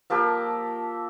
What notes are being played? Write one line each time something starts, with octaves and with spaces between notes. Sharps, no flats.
F3 A#3 G4 A4